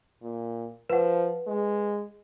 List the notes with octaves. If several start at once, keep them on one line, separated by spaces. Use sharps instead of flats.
A#2
F3 B4 F#5
G#3